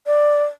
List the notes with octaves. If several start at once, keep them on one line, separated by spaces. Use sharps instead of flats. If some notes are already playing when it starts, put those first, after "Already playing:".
D5